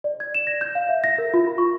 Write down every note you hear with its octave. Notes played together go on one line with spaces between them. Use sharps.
D5
G#6
E7
A#6
G6
F5
E5
A#6
A#4
F4
B5
C#6